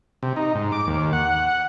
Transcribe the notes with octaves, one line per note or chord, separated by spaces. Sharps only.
C3
D#4
G#2
D6
D#2
F#5